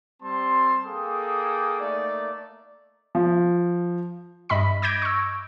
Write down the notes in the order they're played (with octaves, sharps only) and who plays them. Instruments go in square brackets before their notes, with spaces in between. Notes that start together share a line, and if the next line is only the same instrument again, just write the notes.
[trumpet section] G3 C4 A5 C6
A#3 G#4 A4 G5 D6 D#6
A3 A#3 D#4 D5
[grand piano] F3
[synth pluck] G2 D#5 E5 B5 B6
D6 G6 G#6 A#6 D7
C#6 E6